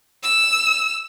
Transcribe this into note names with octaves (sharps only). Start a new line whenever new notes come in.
E6